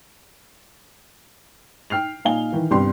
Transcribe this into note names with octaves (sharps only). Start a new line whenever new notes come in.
G5 F6 C7 F7
A#2 D#4 F5 G#5 G7
D#3 E3
C2 G2 B3 G4 C6